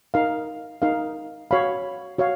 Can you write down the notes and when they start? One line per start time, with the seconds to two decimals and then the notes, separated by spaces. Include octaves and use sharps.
0.14 D#4 A#4 F5
0.82 D#4 A#4 F5
1.51 F#4 C#5 F5 B5
2.18 F#4 C#5 F5